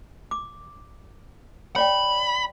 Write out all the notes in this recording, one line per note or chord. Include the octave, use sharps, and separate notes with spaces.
D6
C#5 D5 G5 B5